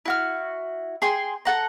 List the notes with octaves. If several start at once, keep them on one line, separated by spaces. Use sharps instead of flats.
E4 F#4 F6
G#4 G5 C6
A4 F#5 A#5